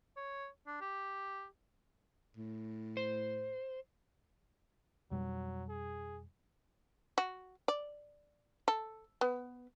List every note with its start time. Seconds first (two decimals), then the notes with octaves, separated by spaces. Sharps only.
0.17 C#5
0.67 D4
0.81 G4
2.37 A2
2.97 C5
5.11 F2 B2 F#3 G3
5.69 G#4
7.18 F#4
7.68 D5
8.68 A4
9.21 B3